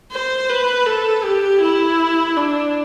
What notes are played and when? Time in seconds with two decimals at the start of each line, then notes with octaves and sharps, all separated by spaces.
0.11 C5
0.49 B4
0.86 A4
1.24 G4
1.61 E4
2.36 D4